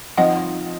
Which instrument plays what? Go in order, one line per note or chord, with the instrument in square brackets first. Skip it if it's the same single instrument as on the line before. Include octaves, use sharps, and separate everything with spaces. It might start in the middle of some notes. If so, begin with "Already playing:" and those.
[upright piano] F3 C4 D#4 [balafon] D#5 F#5